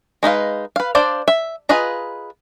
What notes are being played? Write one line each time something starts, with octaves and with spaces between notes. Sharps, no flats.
G#3 D#4 B4 F5
B4 F5
D4 C5 D5 F5
E5
F4 G#4 B4 D#5 A#5